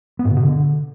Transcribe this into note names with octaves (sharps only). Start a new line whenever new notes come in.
B3
G#2
C#3
B2
D3